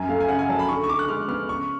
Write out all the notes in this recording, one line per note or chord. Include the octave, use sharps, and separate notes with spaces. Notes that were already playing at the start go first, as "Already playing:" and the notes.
Already playing: F#2 G#5
A3 F5
G#5
C#3 F#5
G#5
F#3 A5
B5
D3 C#6
C#6
D3 D6
F#6
G#3 F6
B3 F6
C#3 C#6